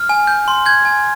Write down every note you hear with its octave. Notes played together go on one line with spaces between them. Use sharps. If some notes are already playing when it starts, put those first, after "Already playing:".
Already playing: F6
G#5
G6
C6
G6 G#6
G#5